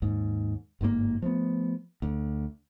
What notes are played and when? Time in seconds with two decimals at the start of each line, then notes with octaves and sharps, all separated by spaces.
0.02 D#2 G#2
0.81 G1 G#2 D3 A#3
1.22 F3 A3 B3
2.02 D2